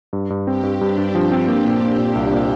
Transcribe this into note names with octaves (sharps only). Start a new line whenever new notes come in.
G2
G2
C4 G4
G2
G2 D4
G2
F3
C4
A#3
A#2
A#3
A#2
C2
A#2